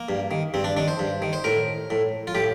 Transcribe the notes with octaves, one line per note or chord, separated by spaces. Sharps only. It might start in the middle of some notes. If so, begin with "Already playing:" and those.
Already playing: A#3
G2
D#3
G2 C4
D4
D#3 D4
C5
G2
D#3
C5
A2 A#4
A2
F4
A2 G4